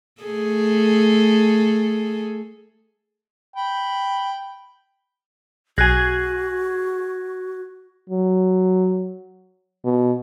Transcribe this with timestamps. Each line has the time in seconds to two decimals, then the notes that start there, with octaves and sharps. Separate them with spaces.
0.22 A3 G#4 A4
3.56 G5 B5
5.78 B1 F#4 G#4 G#5 F#6 G#6 A#6
8.10 F#3
9.85 B2